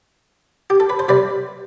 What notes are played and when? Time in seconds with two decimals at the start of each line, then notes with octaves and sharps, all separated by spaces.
0.70 G4
0.80 A4
0.90 B4
0.99 C5
1.08 C3 G3 C4 B4 D5